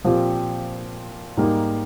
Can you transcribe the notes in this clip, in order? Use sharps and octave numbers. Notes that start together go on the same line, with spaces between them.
A#2 F3 C4 G4
G#2 G3 A#3 D#4